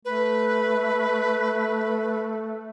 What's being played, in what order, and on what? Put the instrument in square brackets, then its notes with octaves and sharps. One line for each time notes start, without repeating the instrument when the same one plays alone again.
[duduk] A3 [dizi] B4